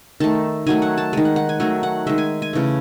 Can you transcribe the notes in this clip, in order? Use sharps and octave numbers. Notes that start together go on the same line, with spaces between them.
D#3 A3 A5
D#3 F#3 A3 G#5
F#5
A5
D#3 G#3
F#5
F#5
G#5
D#3 F#3 A3 G#5
F#5
D#3 G#3 E5
G#5
G#5
C#3 E3 A3